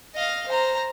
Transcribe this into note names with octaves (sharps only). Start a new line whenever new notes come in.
D#5 F5
C5 A#5